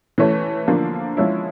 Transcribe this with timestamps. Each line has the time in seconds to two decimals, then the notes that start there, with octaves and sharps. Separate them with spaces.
0.18 E3 A3 C#4
0.67 D3 F3 A#3 D4
1.17 F3 G#3 C#4 E4